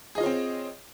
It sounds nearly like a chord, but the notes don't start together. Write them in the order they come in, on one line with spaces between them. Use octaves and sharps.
G#4 D#5 F4 C#5 C4